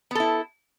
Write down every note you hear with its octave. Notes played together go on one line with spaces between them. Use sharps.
B3 E4 A4